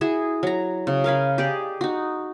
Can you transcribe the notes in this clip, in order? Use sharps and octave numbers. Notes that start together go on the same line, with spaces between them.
E4 F#4 G#4 E5
F#3 A#5
C#3
A#4 F5 G#5 B5
G4 G#4 D5 D#5
D#4 F#4